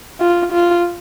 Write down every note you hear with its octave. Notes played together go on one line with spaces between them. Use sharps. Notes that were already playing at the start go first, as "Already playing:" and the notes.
F4
F4